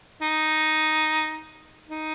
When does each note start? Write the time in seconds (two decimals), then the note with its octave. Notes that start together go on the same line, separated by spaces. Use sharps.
0.22 D#4
1.89 D#4